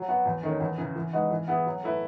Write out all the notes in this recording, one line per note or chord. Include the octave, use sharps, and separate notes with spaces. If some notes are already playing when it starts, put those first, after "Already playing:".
Already playing: F#3
B3 F#4
E2
D#3 A3 C#4
E2
C#3 E3
E3
G#3 D#4 F#4 B4
E3
B3 E4 G#4
F#3
A3 E4 B4